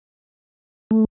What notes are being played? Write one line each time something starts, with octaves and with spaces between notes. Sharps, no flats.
A3